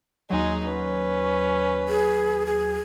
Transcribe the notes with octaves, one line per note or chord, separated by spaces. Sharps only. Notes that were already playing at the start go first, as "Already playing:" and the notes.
D#2 F#3 G#3 D#4 G#4
C#4 B4
G#4
G#4